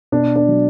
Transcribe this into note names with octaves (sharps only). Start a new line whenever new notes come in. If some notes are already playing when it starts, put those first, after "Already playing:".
B2 D4
D4
F#3